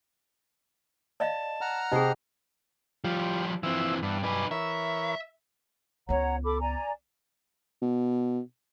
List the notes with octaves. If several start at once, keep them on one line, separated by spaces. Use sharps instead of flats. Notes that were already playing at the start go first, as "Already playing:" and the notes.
D5 D#5 F5 A5
F#5 A#5 F6
C3 D#4 G4 G#4 C5 D#5
F3 G3 F4 G4
E3 F3 C4 E5 E6
G2 E3 B3 D4
G2 D#4 B4 G#5 D6
E3 A#4 C#5 E5
C#2 B3 C#5 F#5 A#5
A4 B5 D6
D5 G#5 A#5
B2